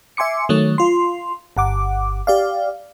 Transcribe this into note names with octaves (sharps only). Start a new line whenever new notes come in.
E5 G#5 C6 D6 C#7
D#3 F#3 A3 C#5
F4 C6
G1 F#5 D6
G4 D5 F5